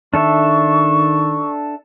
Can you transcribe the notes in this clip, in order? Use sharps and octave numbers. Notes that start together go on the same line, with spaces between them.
D#3 D4 A4 E5 C#6